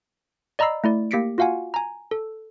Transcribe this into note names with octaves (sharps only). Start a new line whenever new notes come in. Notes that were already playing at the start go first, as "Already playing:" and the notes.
D5 D#5 A#5 B5 E6 C7
A3 E4 D5
A#3 G4 A#6 B6 C#7 D7
F4 F#4 F5 F#5 G#5
G#5 A#5
A4